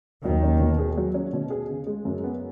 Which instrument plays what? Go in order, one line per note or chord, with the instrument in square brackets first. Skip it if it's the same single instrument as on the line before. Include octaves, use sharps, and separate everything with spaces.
[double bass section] D#2 D#3 [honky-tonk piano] F#3
[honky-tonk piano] C#4
B2
G#4
F#3
C#4
B2
G#4
C#3
G#3
F#2
B3